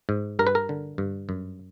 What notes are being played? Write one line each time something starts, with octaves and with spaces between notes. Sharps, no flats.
G#2
G2 A#4
B4
A#4
D3
G2
F#2